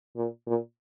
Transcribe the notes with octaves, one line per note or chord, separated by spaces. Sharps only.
A#2
A#2